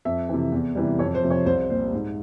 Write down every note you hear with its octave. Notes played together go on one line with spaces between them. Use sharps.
F2 E5
C3 E3
E2
C3 E3 G3
F2 C#5
C5
C3 F3
C#5
C2 C5
A#2 G3 C5
G#2